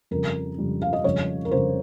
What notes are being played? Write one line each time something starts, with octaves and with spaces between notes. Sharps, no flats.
F2 C#3 G3 A#4
F2 C#3 G3
F5
D#5
F2 C#3 G3 C#5
A#4
F2 C#3 G3 C5